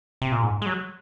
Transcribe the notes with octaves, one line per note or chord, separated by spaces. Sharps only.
C3
A#2
G#2
G#3
F#3